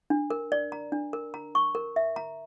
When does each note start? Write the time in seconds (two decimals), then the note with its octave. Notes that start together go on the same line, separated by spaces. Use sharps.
0.10 D4
0.30 A#4
0.52 D5
0.72 A#5
0.92 D4
1.13 A#4
1.34 A#5
1.55 C#6
1.75 A#4
1.96 E5
2.16 A#5